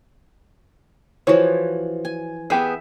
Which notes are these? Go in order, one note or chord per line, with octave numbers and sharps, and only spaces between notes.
E3 F3 F#4 C#5
G#5
B3 G4 G#4 E5